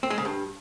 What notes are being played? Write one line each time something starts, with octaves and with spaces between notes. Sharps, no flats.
C4
G#3
C#3
G2